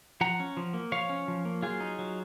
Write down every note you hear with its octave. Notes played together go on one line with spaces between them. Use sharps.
F3 F#5 A#5
C#4
F3
A#3
F3 C#5 F5
C#4
F3
A#3
F#3 F4 G#4
D#4
F#3